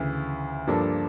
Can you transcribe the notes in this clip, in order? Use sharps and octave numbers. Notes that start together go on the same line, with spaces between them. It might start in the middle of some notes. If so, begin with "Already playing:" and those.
Already playing: D2 C#3 E3
G2 F3 A#3 D4 A4